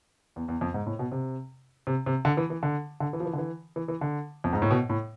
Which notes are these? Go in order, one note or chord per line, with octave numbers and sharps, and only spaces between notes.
E2
E2
F2
G#2
A2
B2
C3
C3
C3
D3
E3
E3
D3
D3
E3
F3
E3
D3
E3
E3
E3
D3
F2
G#2
A2
B2
A2